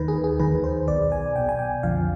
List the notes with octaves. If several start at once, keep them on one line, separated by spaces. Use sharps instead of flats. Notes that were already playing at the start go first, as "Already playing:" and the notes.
Already playing: D#2 D#3 B4
G#4
G#4
D#2 D#3 B4
C5
B1 B2 D5
G#5
B1 B2 G5
G#5
G5
F2 D3 F3 F5